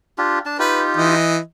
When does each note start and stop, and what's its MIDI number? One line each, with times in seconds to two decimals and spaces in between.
0.18 0.39 62
0.18 0.39 65
0.18 0.39 67
0.46 0.58 62
0.46 0.58 81
0.59 1.15 63
0.59 1.15 65
0.59 1.15 67
0.59 0.82 71
0.97 1.38 52
0.97 1.38 75